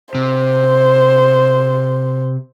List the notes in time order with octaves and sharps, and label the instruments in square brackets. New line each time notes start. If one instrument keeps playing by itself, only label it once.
[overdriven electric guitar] C3 [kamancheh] C5